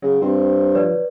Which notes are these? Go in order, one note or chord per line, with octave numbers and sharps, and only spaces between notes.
C#3 F#3
G2 C4
F3 B4 C#5 D5